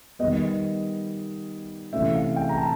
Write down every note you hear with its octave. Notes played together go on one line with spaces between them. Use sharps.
D#3 G3 B3 D#5
C3 E3 A3 C#4 E5
F5
G5
A#5
A5